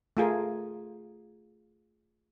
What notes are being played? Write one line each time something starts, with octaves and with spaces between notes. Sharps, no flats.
A3 F4 G#4 A#4